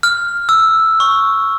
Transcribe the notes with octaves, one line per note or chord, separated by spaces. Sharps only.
F6
E6
C#6